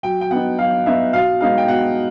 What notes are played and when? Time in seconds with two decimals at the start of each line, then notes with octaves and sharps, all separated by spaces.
0.03 F#3 G5
0.21 G5
0.31 B3 D#4 F#5
0.58 F#3 F5
0.86 B3 D#4 E5
1.13 B2 F5
1.41 G#3 B3 D#4 F5
1.58 G5
1.68 B2 F#5